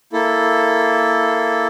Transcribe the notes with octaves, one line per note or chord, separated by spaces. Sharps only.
A#3 E4 A4